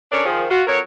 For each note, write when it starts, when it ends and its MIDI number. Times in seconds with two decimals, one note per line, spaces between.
0.12 0.23 61
0.12 0.23 62
0.12 0.23 69
0.12 0.23 70
0.12 0.23 73
0.12 0.23 74
0.25 0.45 51
0.25 0.45 53
0.25 0.45 68
0.50 0.62 65
0.50 0.62 66
0.67 0.79 41
0.67 0.79 54
0.67 0.79 59
0.67 0.79 70
0.67 0.79 73